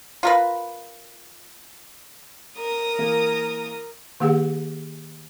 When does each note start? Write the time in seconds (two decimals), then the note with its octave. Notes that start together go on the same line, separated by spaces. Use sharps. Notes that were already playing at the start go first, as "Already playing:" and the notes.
0.23 F4 A#4 B4
2.58 A#4 A#5 D#6
2.98 E3 A#3
4.20 D#3 A#3 G4 G#4 F#5